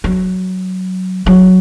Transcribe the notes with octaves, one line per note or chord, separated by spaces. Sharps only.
F#3
F#3